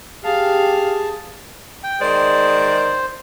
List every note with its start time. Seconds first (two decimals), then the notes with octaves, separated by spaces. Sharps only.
0.24 G4 G#4 F5 A5
1.84 G5
2.01 D#3 G#3 C5 D5